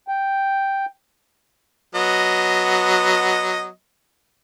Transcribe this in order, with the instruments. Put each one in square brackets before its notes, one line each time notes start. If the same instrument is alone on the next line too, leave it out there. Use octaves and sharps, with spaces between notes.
[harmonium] G5
[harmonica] F#3 B3 D#5